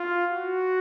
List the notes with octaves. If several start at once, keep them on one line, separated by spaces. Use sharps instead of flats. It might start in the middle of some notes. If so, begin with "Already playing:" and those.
Already playing: F4
F#4